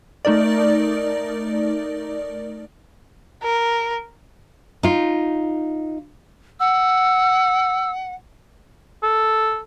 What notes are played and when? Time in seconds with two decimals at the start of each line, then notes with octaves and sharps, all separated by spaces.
0.25 A3 D#4 A#4 D5
3.43 A#4
4.83 D#4 F4
6.60 F#5 E6
9.03 A4